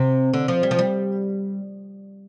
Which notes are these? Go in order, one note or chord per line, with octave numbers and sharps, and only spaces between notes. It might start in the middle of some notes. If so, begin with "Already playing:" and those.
Already playing: C3
D3
F3
G3
F3
G3